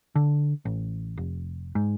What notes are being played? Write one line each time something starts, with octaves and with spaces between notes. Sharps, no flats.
D3
A1
F1
G#2